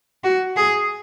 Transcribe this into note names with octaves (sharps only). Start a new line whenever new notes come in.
F#4
G#4